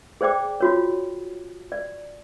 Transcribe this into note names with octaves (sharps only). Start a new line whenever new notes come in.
G#4 C5 D5 G5 D6
F4 F#4 C#5
D5